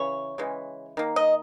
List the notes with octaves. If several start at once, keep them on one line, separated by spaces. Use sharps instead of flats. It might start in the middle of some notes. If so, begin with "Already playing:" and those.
Already playing: C#3 E3 C#5
C#3 E3 G#3
D#3 A#3
D#5